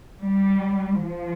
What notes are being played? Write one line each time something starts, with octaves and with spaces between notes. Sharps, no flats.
G3
F3